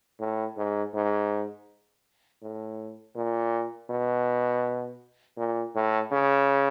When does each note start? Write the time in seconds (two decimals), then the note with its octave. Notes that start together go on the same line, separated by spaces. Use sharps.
0.20 A2
0.57 G#2
0.94 G#2
2.42 A2
3.15 A#2
3.90 B2
5.37 A#2
5.75 A2
6.12 C#3